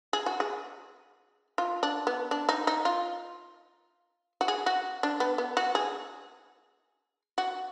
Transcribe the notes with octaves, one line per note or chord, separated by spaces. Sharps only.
G#4
F#4
G#4
F4
D4
B3
D4
D#4
D#4
F4
F#4
G#4
F#4
D4
B3
B3
F#4
G#4
F#4